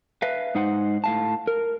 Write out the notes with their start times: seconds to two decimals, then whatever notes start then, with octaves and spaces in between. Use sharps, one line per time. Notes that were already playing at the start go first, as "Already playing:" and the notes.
0.22 B4 E5 F5
0.55 G#2 D#4 C5 F#5
1.04 A2 F5 A5
1.47 A#4